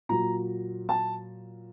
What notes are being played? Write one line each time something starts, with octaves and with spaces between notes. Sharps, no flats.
A#2 F#3 A#5
A5